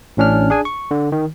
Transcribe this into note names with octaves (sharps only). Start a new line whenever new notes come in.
A1 A2 C#4 D4 F6
D4 G#4 G#5
C#6
D3
D#3